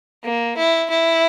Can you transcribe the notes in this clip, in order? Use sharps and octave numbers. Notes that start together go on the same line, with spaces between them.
A#3
E4
E4